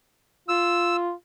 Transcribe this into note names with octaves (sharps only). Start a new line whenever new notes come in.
F4 E6